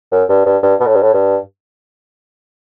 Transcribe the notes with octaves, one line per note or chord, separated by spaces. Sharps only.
F#2
G2
G2
G2
B2
A2
G2
A2
G2